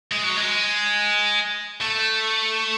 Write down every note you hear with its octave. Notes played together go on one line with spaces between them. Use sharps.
G#3
F#3
G#3
A3